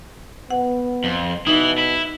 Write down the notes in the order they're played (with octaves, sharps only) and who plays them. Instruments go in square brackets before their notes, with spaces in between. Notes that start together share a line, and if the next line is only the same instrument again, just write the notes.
[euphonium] B3 [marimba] F#5
[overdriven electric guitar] F2
[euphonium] B2 [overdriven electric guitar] E3 E4 [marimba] D#4
[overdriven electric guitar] E4